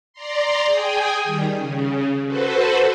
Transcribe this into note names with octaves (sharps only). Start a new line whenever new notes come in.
D5 A#5 C6
G#4 G5 G#5 D#6
D#3 G3
C#3
F#4 A4 B4 C5